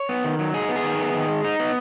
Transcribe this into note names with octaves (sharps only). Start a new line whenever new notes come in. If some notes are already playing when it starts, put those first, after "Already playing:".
Already playing: C#5
B3
D#3
F#3
D#4 G#4
B3
G#4
D#3
B3
D#3
G#3
D#4
B3